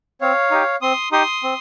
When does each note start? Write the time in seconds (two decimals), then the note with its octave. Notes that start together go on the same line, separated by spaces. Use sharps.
0.21 C4 C#5 F5
0.51 D#4 G4
0.81 C4 C6 D#6
1.12 D#4 G4 C6 D#6
1.43 C4